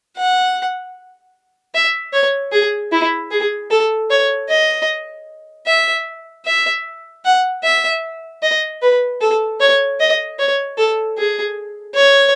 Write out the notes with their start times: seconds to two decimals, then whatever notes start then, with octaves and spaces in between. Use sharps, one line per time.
0.17 F#5
1.74 E5
2.13 C#5
2.52 G#4
2.92 E4
3.31 G#4
3.70 A4
4.10 C#5
4.49 D#5
5.67 E5
6.45 E5
7.25 F#5
7.63 E5
8.42 D#5
8.82 B4
9.21 A4
9.60 C#5
10.00 D#5
10.39 C#5
10.77 A4
11.18 G#4
11.95 C#5